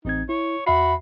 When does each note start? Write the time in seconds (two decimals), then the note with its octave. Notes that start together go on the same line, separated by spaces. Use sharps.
0.05 A1 C4 D#4 G#6
0.29 E4 C#5
0.67 E2 F#4 E5 B5 C7